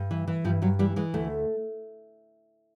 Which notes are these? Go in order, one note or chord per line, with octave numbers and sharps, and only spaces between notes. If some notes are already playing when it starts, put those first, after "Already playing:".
Already playing: G2
E3
E3
G2 F3
G2 F#3
E3 G3
E3 G#3
D2 A3